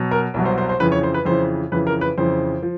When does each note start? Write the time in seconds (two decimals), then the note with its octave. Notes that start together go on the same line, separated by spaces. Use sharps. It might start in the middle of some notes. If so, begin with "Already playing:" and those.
Already playing: B2 F#3
0.11 A#4
0.34 C2 B2 F#3
0.46 C5
0.58 C5
0.69 C5
0.80 F2 C#3 E3 B4
0.92 C#5
1.03 C5
1.14 B4
1.25 F2 C#3 E3 C5
1.72 F2 C#3 E3 B4
1.87 A#4
2.01 B4
2.18 F2 C#3 E3 C5
2.62 F3